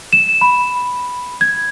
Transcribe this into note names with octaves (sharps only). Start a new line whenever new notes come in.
E7
B5
G#6